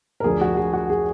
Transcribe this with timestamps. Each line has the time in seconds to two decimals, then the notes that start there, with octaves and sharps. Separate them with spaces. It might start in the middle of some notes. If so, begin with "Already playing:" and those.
0.20 A#4
0.24 D2 D3 F3 G#4
0.41 F#4
0.57 G#4
0.73 F#4
0.90 G#4